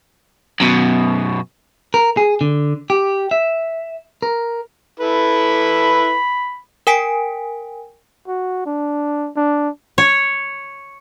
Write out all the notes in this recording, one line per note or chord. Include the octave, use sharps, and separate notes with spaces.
F#2 B2
A#4
G#4
D3
G4
E5
A#4
E4 A4 B4 B5
A#4 G5 G#5 B6 D7
F#4
D4
D4
C#5